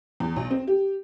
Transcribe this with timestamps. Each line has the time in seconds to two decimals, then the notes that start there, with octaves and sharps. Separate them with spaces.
0.20 E2
0.36 B1
0.50 C4
0.67 G4